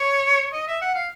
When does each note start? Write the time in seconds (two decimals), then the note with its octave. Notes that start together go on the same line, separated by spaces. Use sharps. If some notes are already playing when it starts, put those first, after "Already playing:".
Already playing: C#5
0.53 D#5
0.68 E5
0.81 F#5
0.95 F5